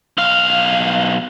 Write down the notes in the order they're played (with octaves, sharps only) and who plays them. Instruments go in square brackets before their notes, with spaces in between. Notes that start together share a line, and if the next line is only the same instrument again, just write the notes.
[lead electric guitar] B1 F5